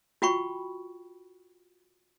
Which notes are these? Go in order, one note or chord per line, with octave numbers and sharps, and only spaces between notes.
F4 F#4 G5 B5 C#6